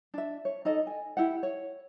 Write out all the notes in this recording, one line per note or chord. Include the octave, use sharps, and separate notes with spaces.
D4 E5
C#5
D#4 A4 D#5
G#5
E4 G4 F#5
C#5